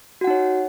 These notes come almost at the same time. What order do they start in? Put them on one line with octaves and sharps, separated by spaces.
F#4 F#5 D#4 C#5